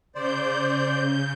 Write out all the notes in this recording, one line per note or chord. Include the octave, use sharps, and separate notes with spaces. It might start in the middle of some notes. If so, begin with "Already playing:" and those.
C#3 C5 D5 G6